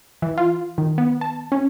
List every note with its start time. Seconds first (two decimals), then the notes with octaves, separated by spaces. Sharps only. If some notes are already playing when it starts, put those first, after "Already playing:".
0.22 E3
0.38 F4
0.78 D#3
0.98 B3
1.21 A5
1.52 C#4